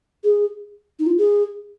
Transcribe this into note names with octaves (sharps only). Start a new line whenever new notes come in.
G#4
D#4
F4
G#4